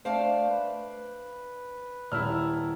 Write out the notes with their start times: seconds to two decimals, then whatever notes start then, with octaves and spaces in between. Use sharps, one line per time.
0.05 A3 D4 C5 F5
0.50 B4
2.12 D#1 E4 E6 F6